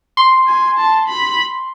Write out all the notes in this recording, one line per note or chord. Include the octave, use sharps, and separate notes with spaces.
C6
G#5
A5
B5